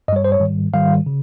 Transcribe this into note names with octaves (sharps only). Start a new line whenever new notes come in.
G2 G3 C#5 D#5
C5
C#5
G#2 D#3 G3
G#2 D#3 G3 F5
C#3